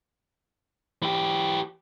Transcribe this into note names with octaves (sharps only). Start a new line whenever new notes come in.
E3 G4